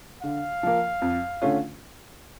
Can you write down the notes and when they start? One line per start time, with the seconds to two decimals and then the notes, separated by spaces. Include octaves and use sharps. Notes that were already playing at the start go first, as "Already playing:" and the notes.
0.23 D3 F5
0.63 F3 A#3
1.02 F2
1.42 D3 A3 C#4 F4